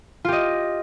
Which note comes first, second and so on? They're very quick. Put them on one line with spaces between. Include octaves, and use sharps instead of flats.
F4 G4 D#5